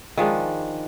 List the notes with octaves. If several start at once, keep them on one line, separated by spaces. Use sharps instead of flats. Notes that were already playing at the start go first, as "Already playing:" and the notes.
D#3 F3 G#3 D4